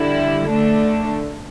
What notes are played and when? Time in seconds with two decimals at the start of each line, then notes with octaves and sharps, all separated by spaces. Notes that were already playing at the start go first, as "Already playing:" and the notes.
Already playing: D3 G3 E4
0.50 D3 A3 D4